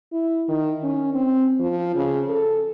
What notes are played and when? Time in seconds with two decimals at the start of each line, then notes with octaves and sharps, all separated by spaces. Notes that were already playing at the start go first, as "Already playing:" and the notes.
0.12 E4
0.48 D#3
0.83 C#4
1.14 C4
1.60 F3
1.95 C#3
2.29 A4